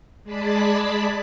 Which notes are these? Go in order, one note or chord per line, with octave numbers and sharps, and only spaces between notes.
G#3 G#4 D5 A5 B5 B6